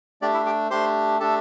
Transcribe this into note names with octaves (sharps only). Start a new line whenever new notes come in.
A3 D4 G4 D5
E4 E5
G4 G5
A3 D4 G4 C5 C6
A3 D4 G4 A4 A5